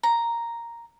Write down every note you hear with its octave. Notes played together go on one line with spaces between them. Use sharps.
A#5